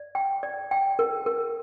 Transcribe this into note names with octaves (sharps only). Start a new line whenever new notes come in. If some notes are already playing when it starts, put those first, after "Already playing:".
Already playing: D5
G5
D5
G5
A#4
A#4